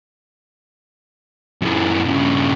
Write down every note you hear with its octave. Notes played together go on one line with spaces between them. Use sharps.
F#2 E3
G2 C#3